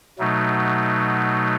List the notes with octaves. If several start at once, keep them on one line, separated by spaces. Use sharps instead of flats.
B2 F#3 A3 D#4